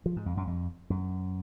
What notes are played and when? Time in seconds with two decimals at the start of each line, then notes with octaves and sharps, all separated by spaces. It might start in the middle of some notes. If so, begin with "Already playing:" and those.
0.06 F3
0.16 G#2
0.26 F2
0.37 F#2
0.47 F2
0.90 F#2